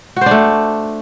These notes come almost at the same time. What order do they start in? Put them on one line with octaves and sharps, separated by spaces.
F#4 C5 D4 A3